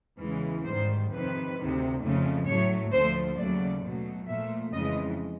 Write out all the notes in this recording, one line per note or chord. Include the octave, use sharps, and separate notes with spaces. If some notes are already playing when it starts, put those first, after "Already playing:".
E2 C#3 E3 G#3
G#2 D#3 G3 C5
F2 C3 D#3 B4
D2 C3 D#3
F2 C#3 F3 A3
A2 F#3 A3 C#5
D2 D3 F3 A3 C5
D#2 C#3 F#3 A3 D5
B2 F#3 A3
A#2 F3 A3 E5
F2 C#3 E3 G#3 D#5